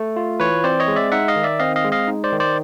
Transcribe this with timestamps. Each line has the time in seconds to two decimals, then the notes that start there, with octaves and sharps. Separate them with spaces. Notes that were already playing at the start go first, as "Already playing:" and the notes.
Already playing: A3
0.16 F4
0.40 E3 B4 C#5
0.64 C4 C5 D5
0.80 C#5 D#5
0.88 G#3
0.96 D5 E5
1.12 D#4 E5 F#5
1.28 D#5 F5
1.36 D#3
1.43 D5 E5
1.60 C4 D#5 F5
1.76 D#5 F5
1.84 G#3
1.92 D#5 F5
2.07 D#4
2.24 C5 D5
2.32 D#3
2.40 C5 D5